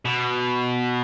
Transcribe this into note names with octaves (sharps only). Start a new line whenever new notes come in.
B2